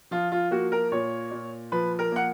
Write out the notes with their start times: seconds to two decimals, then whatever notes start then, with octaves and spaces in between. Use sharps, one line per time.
0.11 F3 F4
0.32 F4
0.51 A#3 F#4
0.72 A#4
0.92 A#2 C#5
1.31 A#2
1.72 F3 B4
1.99 A#4
2.12 A#3 F#5